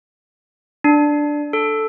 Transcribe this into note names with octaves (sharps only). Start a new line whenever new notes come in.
D4
A4